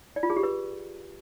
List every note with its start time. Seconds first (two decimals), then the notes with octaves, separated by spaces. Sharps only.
0.16 D5
0.23 F4
0.30 G#4
0.37 G4
0.43 B4